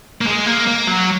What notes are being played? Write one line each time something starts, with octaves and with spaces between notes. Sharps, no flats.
A#3
G#3
A#3
A#3
F#3